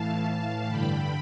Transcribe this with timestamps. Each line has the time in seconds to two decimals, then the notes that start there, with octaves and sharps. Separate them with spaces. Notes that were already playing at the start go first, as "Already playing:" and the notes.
Already playing: A2 E3 F5 A5
0.67 G2 D3 G5 B5